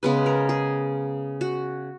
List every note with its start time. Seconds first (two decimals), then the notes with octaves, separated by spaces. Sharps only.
0.03 C#3 G#3 B3 B4
0.26 A#4
0.49 G#4
1.41 F#4